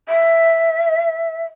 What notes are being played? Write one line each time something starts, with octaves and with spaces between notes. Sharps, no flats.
E5